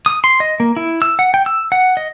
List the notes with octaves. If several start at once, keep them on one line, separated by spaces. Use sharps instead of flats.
D#6
C6
D#5
A#3
E4
E6
F#5
G5
E6
F#5
D#5